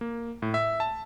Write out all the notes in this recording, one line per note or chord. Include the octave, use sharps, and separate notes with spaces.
A#3
A2
E5
A5